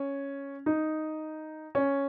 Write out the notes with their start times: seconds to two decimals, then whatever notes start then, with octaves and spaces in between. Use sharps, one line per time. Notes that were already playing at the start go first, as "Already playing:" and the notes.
Already playing: C#4
0.66 D#4
1.75 C#4